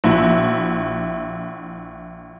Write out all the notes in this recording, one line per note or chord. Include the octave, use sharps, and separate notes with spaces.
A#1 E4 F#4